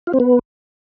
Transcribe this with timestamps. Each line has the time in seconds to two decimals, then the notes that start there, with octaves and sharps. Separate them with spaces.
0.07 F4
0.14 C4
0.20 B3